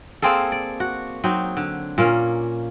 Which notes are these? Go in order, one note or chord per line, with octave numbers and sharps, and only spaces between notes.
A#3 C4 G#4 A4
D5
F#4
F#3 C4 D#4
D3
A#2 A#3 C#4